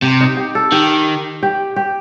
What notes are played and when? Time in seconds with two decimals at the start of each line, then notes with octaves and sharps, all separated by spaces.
0.02 C3 G4
0.21 D#4
0.37 G4
0.55 A4
0.72 D#3 G4
1.43 G4
1.76 G4